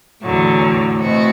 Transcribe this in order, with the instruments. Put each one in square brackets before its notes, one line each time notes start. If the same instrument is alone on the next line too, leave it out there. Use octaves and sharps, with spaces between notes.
[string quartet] E2 D3 F#3 [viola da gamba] A2
[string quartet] B2 A3 C4 F#4